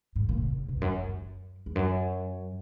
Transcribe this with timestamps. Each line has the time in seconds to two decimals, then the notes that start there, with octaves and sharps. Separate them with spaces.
0.16 G#2
0.29 A#2
0.42 C#3
0.55 C#3
0.69 B2
0.76 E2
0.81 F#2
0.95 F#2
1.03 E2
1.08 F#2
1.66 E2
1.75 F#2